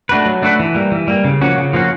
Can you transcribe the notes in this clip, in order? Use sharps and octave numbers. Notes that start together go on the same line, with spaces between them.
A3 D4 F#4 B4
F#3
A3 D4 F#4 B4
E3
G3 A#3
E3
G3 A#3
C#3
F3 A#3 C#4 F#4
C#3
F3 A#3 C#4 F#4